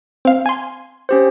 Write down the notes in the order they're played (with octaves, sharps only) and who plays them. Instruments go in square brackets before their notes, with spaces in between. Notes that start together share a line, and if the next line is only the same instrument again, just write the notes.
[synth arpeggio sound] C4 F5
G#5 C6
[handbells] C#4 G4 C5